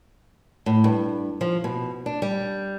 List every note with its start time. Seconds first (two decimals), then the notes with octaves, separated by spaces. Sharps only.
0.66 A2
0.84 G2
1.41 F3
1.64 B2
2.06 D4
2.22 G3